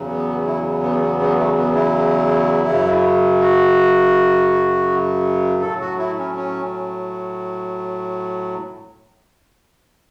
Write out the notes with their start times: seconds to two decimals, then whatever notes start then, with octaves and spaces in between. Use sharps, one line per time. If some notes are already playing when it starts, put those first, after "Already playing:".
Already playing: E2 C#3 F#3
0.09 B3
0.46 E4
0.82 B3
1.02 B3
1.20 B3
1.38 A3
1.57 B3
1.75 E4
2.67 F#2 C#3 F#3
3.41 F#4
5.62 A2 F#3 A4
5.81 F#4
5.98 E4
6.18 C#4
6.36 C#4